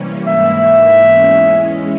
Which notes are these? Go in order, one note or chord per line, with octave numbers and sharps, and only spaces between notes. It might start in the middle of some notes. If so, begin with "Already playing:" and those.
Already playing: C3 E3 G3 A#3 C#4
G#2 E3 A#3 E4 E5
E2 E3 G#3 C#4